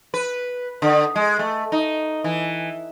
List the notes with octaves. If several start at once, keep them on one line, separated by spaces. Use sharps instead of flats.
B4
D3
G#3
A3
D#4
E3